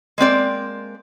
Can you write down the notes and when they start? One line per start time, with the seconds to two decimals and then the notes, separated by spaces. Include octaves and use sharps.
0.18 G#3 A#3 C4 D5